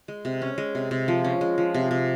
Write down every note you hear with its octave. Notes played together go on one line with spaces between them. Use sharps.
G#3
C3
C#4
G#3
C3
C3
F3
C#4
G#3
F3
C3
C3